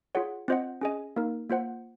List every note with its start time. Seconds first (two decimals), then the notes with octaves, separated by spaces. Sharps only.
0.15 F4 G#4 C#5 F#5
0.48 C4 F4 C5 D#5 F#5
0.81 C#4 G#4 D#5 G#5
1.16 A#3 D#4 A#4
1.50 A#3 F4 C5 F#5